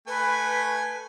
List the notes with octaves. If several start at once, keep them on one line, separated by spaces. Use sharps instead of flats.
A3 B4 G#5